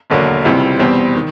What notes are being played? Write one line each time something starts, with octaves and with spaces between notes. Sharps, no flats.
E1 D#2 D3 F#3 A#3
C#2 C3 E3 G3 C4
E2 B2 G3 C4
D#3